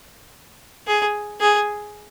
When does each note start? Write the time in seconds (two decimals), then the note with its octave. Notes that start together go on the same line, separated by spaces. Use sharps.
0.87 G#4
1.41 G#4